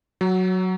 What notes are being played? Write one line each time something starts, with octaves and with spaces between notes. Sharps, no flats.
F#3